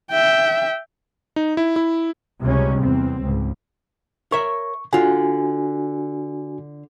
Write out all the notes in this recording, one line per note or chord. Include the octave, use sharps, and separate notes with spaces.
E5 G5
D#4
E4
E4
C#2 C3 G3 G#3 C#4
E2 C4
C#2 G#2
A#4 C#5 E5 C#6
D3 D4 F4 F#4 G#5